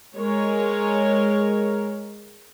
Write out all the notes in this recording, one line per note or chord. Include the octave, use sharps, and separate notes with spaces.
G#3 A#4 C#5